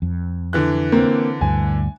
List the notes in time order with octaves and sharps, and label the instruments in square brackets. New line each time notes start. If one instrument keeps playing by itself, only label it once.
[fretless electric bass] F2
[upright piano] D3 E3 F#6
[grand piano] A#3 C4
[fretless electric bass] D2 G2 [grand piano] G#5